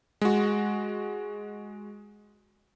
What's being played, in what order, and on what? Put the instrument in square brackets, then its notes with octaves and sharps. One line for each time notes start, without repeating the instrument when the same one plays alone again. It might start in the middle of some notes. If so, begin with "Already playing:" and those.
[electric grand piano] G#3 F#4